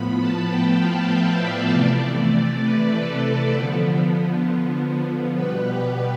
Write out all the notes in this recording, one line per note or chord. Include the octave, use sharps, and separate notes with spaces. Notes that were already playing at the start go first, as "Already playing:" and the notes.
Already playing: A2 F3 B3 B5
A5
G5
F5
E5
D5
C3 E3 A3
B4
A4
D3 F3 B3
B2 G3 B3 B4
G4